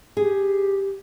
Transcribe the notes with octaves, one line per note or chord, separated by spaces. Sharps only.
G4 G#4